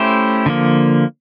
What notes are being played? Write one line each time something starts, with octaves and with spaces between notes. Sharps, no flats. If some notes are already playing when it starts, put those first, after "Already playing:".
Already playing: A3 C#4 E4 G4 C5
D3 F3 A#3